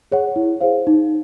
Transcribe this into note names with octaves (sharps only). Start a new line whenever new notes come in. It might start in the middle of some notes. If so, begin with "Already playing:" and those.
G#4 C#5 F#5
E4
G#4 C5 F5
D#4